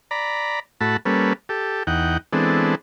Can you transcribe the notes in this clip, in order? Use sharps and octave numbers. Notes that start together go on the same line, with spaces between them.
D5 A#5 B5
A2 A3 F#4 A5 B5
G3 A#3 C#4 A4 B4
G4 A4
E2 D#4 F#5 G5
E3 G#3 B3 C4 D4 A4